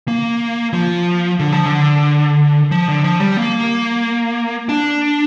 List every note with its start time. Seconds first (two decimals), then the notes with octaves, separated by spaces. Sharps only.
0.08 A#3
0.73 F3
1.40 D3
1.52 F3
1.66 D3
2.71 F3
2.88 D3
3.04 F3
3.20 G3
3.37 A#3
4.69 D4